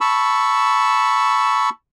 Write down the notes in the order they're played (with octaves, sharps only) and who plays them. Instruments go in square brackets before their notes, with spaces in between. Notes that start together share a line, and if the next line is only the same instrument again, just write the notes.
[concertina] A5 B5 C#6 E6